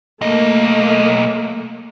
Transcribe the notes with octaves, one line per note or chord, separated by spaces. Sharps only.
B1 A3 A#3 D#5